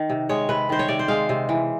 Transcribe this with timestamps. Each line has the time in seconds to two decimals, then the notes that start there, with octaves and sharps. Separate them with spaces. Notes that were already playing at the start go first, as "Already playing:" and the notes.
Already playing: D#3
0.10 C3
0.29 G#3 C#5
0.49 C3 B4
0.69 D#3 C5
0.79 C#5
0.88 C3 D5
0.99 C5
1.08 G#3 F5
1.29 C3
1.49 E3